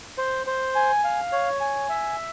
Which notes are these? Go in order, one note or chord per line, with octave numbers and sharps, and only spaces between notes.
C5
C5
G#5
F5
C#5
G#5
E5